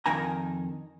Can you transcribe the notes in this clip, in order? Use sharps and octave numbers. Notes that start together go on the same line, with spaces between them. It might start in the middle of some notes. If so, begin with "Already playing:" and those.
F2 D#3 G#5 A#5